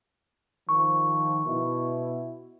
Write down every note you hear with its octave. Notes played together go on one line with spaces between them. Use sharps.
D#3 F3 C#6
B2 E4